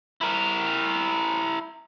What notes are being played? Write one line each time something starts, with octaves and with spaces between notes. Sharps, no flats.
E4 A#4